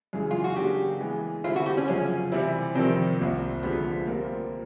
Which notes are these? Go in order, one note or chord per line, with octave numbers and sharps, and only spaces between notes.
F#2 C#3 E3 G#3
F4
F#4
C#3 F#3 A#3 D4 F#4 G4
E3 G#3 B3
D3 G3 C4 E4 F4
F#4
G4
C#4
F#2 C#3 F3 C#4
C3 E3 G3 C4 E4
F2 C3 D#3 G3 C4
C2 A#2 G3 C4
D2 D3 F3 G#3 B3 C4
A#2 G3 C4 F4 A#4